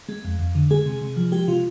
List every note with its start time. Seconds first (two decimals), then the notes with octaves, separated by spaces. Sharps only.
0.09 G#3
0.25 F2
0.39 F2
0.55 D3
0.70 G#3 G#4
0.86 C3
1.01 C3
1.17 F3
1.32 G#3 G4
1.48 C3 F4